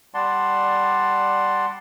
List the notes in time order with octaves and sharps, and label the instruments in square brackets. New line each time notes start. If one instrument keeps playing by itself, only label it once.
[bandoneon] G3 D5 F#5 A5 C6